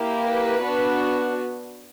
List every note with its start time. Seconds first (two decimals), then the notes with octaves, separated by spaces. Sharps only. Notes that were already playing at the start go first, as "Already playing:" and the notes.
Already playing: A#3 E4 G4
0.23 B4
0.62 B3 D4 F#4